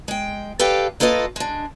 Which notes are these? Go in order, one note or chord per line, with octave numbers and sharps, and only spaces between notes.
G#3 G5
G4 A4 B4 D5 F5 G5
A#3 F4 A4 B4 D#5
G#3 D4